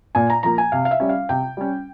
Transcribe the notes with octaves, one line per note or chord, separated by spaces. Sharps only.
A#2 G#5
A#5
F3 A#3 A#5
G#5
C3 F5
F5
E5
G3 C#4
F5
C3 G5
G3 C#4